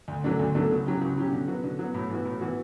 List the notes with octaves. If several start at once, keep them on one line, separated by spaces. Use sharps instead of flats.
D2
D3 F#3 A3 D4
D2
D3 F#3 A3 D4
C#2
C#3 F#3 C#4 G4
C#2
C#3 F#3 C#4 G4
D3
F#3 B3 F#4
D3
F#3 B3 F#4
A2
E3 B3 F#4
A2
E3 B3 F#4